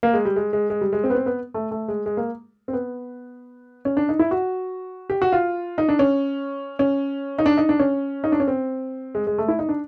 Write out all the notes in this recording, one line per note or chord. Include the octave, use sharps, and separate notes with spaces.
A#3
G#3
G3
G#3
G#3
G#3
G3
G#3
C4
B3
C4
B3
A3
A3
G#3
G#3
A#3
C4
B3
C#4
D4
D#4
E4
F#4
G4
F#4
F4
D#4
D4
C#4
C#4
D#4
D4
D#4
D4
C#4
D#4
D4
C#4
C4
G#3
G#3
A3
E4
D#4
D4